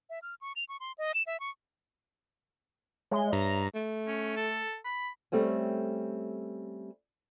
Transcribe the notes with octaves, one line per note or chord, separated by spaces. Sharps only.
E5
F6
C#6
F7
C#6
C6
D#5
E7
E5
C#6
G#3 C#5 E5 G7
G2 A#5
A3
C#4
A4
B5
G3 A3 C4 C#4